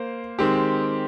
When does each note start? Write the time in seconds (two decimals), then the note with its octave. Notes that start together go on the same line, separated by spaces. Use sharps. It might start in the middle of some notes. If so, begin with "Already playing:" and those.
Already playing: A#3 C5
0.39 D#3 G#3 C4 G4